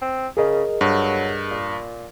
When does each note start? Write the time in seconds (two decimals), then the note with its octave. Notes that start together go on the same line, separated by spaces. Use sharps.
0.02 C4
0.37 C#3 G#4 A#4 D#5
0.81 G2 F#3
1.51 A#2